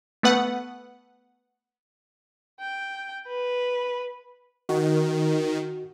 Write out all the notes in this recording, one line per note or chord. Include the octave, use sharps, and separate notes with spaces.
A3 B3 B4 F#5
G5
B4
D#3 F#4